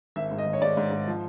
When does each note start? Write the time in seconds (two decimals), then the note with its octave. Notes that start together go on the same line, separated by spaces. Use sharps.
0.16 G#1 E5
0.31 G#2
0.38 D#5
0.46 G#1
0.53 C#5
0.61 G#2 D5
0.77 G#2
0.92 G#2
1.07 F3